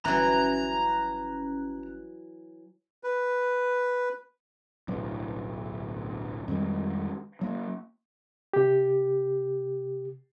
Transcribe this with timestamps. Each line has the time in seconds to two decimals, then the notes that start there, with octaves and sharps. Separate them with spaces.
0.05 G1 E3 F#3 C#4 A#5 F#6
3.04 B4
4.88 D1 B1 F#3
6.48 F2 D#3 G3 G#3
7.41 F#3 A#3
8.53 C3 G4